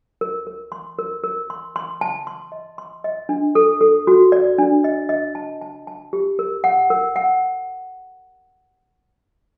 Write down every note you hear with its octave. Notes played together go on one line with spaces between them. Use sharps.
A#4
A#4
C6
A#4
A#4
C6
C6
A5
C6
D#5
C6
D#5
D4
A4
A4
F#4
D5
D4
D#5
D#5
A5
A5
A5
G4
A#4
F#5
A#4
F#5